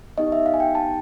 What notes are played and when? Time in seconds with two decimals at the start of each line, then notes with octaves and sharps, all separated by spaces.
0.18 B3 D#4 G4 D#5
0.32 E5
0.46 F5
0.54 G#5
0.60 G5
0.75 A5